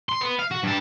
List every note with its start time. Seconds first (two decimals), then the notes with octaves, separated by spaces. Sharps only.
0.09 C6
0.21 B3
0.39 F5
0.51 F#4
0.63 G2 A5